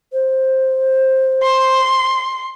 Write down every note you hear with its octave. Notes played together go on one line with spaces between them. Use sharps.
C5
C6